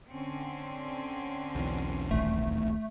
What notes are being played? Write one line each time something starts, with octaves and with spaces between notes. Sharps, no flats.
D3 C4 C#4
B1 E2 E3
D#1 A#1 D#2 A3